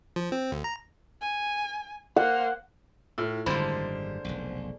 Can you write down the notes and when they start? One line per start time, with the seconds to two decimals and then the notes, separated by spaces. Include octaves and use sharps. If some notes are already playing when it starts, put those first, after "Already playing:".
0.16 F3
0.32 C4
0.52 D2
0.64 A#5
1.21 G#5
2.16 A#3 C5 F#5
3.18 A2 E4 F4
3.46 G#1 F#2 D3 G3 G#3 A#3 C5 B5
4.25 F1 B1